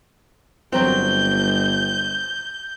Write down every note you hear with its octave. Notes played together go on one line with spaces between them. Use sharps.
G1 F#3 C4 G6